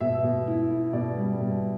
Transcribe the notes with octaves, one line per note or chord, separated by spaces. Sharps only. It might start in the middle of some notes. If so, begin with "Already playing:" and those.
B2 E5
B2
E4
E4
B2 D5
G3
B2